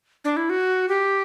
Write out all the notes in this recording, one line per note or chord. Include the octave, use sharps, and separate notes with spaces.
D4
E4
F#4
G4